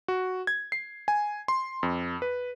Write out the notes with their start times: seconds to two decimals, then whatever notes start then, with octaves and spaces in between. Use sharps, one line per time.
0.08 F#4
0.47 G#6
0.72 C7
1.08 G#5
1.48 C6
1.83 F2
2.22 B4